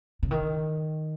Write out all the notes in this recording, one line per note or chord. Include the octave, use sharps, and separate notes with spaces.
C#3
D#3